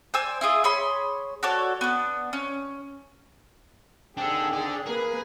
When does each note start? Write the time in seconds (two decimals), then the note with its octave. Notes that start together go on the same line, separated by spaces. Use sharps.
0.14 C5 D5 G#5 E6
0.41 E4 F4 G#4 D#5
0.64 G#4 C#5 B5 C6
1.43 F#4 A4 C#5 D5
1.81 B3 D4
2.33 C#4
4.17 D#2 C4 D4 G#4 A4 G5
4.53 D3 D5
4.86 A#3 G#4 A#4 B4